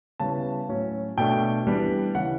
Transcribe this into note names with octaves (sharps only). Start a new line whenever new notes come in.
C#3 G3 B3 E4 A5
A2 F#3 C#4
B2 A3 D4 G5
E3 G3 B3 D4
C#3 E3 G3 F#5